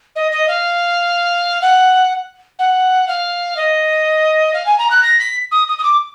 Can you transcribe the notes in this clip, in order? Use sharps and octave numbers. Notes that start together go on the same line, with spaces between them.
D#5
D#5
F5
F#5
F#5
F5
D#5
F5
G#5
A#5
F#6
A#6
B6
D#6
D#6
D#6
D6